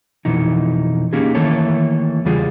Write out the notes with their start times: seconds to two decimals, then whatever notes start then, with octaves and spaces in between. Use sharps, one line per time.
0.25 F2 B2 E3 D#4
1.13 A#3 C#4 D#4 G4 G#4
1.35 D#3 E3 A3 A#3 A4 C#5
2.25 E2 C#3 G3 F4 G#4